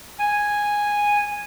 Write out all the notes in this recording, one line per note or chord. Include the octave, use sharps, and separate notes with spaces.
G#5